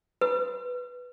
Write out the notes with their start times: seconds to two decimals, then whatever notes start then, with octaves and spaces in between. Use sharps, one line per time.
0.21 B4